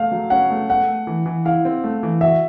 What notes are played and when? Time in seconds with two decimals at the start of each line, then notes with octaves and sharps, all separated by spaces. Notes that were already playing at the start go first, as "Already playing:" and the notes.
Already playing: A3 F5
0.12 F#3
0.30 C#4 F#5
0.51 A3
0.69 A3 F#5
0.89 A3
1.07 E3
1.26 E3
1.45 E4 F5
1.65 C4
1.84 A3
2.03 E3
2.21 F#4 E5